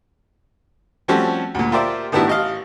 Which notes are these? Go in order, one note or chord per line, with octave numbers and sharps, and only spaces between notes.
F3 G3 A3 C4 C#4 F#4
D2 A#2
F4 G4 A#4 C5 D5 E5
A2 D#3 B3 D4 E4 F#4
A1 D#5 F5